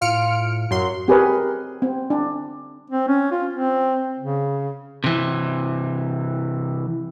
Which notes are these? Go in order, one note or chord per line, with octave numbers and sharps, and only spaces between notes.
A2 F4 F6 C#7 D7
F#2 F#3 C6
C4 G4 G#4 A#4 B4 C#5
C4
D4
C4
C#4
F4
C4
C#3
C3 E3